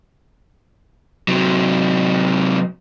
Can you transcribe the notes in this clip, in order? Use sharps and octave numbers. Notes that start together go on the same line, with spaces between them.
C3 F#3